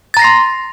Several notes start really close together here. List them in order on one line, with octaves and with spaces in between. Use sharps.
A6 A#5 A#6 C7 C6